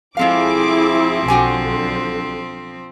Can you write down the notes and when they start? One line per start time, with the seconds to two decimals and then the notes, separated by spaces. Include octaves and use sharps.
0.17 F3 G#3 C4 E4 G#4 A4 F5 D6
1.28 B1 D3 F#4 G4 G#5